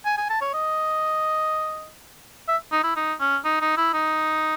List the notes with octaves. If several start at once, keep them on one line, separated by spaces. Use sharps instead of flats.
G#5
G#5
A5
C#5
D#5
E5
D#4
E4
D#4
C#4
D#4
D#4
E4
D#4